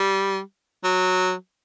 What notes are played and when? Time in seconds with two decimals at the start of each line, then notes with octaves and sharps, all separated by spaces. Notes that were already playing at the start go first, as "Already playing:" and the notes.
Already playing: G3
0.84 F#3